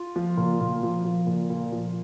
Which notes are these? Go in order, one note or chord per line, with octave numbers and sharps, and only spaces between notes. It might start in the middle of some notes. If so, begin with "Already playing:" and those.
Already playing: F4
F3
A#2
A#2
F3
F3
A#2
A#2
F3